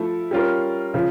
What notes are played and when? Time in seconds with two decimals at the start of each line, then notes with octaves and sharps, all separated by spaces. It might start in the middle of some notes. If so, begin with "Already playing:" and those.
Already playing: F3 A3 E4 A4
0.31 G3 C#4 F4 A#4
0.94 C#3 F3